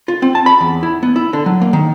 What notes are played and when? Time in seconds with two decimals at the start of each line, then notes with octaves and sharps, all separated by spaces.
0.08 F4
0.22 C4
0.35 A5
0.46 B5
0.61 E2
0.83 E4
1.03 B3
1.16 E4
1.33 D3
1.46 F#3
1.61 A#3
1.73 D#3